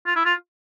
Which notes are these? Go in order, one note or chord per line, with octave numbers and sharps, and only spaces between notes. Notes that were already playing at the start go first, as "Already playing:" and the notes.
F4
E4
F4